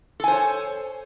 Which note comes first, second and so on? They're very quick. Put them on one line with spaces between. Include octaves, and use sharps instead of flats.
A4 G#5 C5 C#5